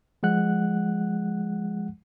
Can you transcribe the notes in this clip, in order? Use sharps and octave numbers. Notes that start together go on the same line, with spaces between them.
F3 G#3 F#5 F#6